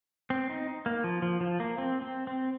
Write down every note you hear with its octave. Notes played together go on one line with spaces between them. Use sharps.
C4
D#4
A#3
F3
F3
F3
A#3
C4
C4
C4